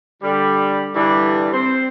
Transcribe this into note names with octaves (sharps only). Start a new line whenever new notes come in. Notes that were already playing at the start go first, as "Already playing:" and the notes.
D3 G3
G2 D3 E3 G3 D4
C4 C5